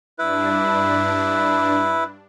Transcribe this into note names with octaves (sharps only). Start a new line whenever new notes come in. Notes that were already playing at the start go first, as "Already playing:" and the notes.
G2 D4 E4 B4